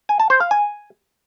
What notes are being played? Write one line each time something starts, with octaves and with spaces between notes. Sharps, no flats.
G#5
A5
C5
F5
G#5